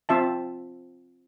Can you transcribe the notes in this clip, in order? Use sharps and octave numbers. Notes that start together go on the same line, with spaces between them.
C4 F4 E5 A5